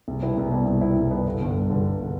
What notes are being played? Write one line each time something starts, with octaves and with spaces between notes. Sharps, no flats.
C2
B2 G3 B3 E4
C2
B2 G3 B3 E4
C2
B2 G3 B3 E4
C2
B2 G3 B3 E4
G1
G2 D3
G1
G2 D3
G1
D3